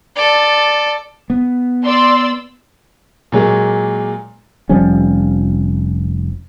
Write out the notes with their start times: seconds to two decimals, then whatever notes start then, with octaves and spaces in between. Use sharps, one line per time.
0.15 A4 D5
1.30 B3
1.84 D5 C6 E6
3.32 A#2 F#3 G#3 A#3
4.69 F1 F3 G3 C#4